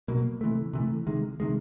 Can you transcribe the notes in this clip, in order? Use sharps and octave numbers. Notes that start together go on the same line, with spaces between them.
B2 F#3 A#3
C3 E3 A3
C3 E3 A3
C3 D#3 G#3
C3 D#3 G#3